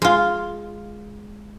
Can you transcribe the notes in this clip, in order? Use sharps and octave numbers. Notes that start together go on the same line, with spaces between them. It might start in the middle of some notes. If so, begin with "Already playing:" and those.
G#3 F4